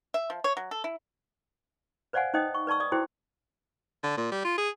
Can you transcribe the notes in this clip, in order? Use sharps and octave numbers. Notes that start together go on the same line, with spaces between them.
E5
F3
C#5
F#3
A4
E4
B4 C5 D5 F5 F#5 G#5
D#4 C5 D#5 G5 D#6
C#6
B4 D5 A5 C#6 E6
D5 D#6
E4 F#4 G#4 C5 G5
D3
A#2
G3
F4
G#4